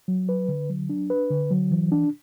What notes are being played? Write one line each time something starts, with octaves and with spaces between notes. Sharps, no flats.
F#3
B4
D3
F#3
D4
B4
D3
F#3
E3
D4